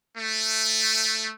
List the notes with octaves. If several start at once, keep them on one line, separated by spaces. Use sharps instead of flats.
A3